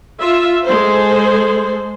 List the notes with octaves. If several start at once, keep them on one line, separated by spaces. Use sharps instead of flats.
F4 E5
G#3 A4 C5